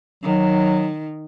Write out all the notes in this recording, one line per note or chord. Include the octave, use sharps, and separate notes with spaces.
D#3 F#3